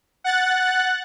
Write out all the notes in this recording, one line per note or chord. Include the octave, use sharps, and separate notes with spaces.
F#5 F#6 A6